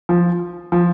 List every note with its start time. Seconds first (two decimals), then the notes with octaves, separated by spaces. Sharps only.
0.09 F3
0.72 F3